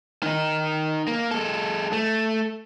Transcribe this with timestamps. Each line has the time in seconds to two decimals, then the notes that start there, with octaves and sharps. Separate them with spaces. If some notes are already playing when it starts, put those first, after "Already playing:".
0.23 D#3 D#4
1.08 A#3
1.31 G#3 A4
1.93 A3